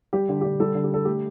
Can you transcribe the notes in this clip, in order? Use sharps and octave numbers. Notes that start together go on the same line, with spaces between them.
G3 G4
D3
D3 G4
G3 A4
D3
G4
D3 A4
A3 G4